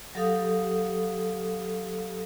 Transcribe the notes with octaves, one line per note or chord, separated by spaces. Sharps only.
F#3 G4 A4 F5 D#6